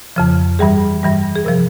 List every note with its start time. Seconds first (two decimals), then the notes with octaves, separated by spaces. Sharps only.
0.16 F2 C#3 F3
0.59 G2 E3 G3 G#4
1.03 G2 E3 G3
1.36 G#4
1.45 C3 F3 A#4